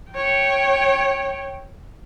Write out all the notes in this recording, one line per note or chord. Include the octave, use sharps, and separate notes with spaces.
C#5 G5